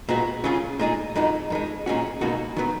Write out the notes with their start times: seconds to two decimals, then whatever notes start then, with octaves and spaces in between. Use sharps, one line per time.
0.09 A#2 G#3 B3 F#4
0.44 C#3 F#3 C#4 F4 G#4
0.79 A#2 G#3 D#4 G#4
1.16 F2 D#3 G#3 D#4 F#4
1.50 F2 D#3 G#3
1.86 A#2 G#3 C#4 F#4
2.21 C#2 B2 A#3 D#4 F#4
2.57 D#3 F#3 B3